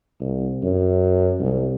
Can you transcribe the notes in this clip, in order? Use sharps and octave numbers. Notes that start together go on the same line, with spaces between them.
C2
F#2
C2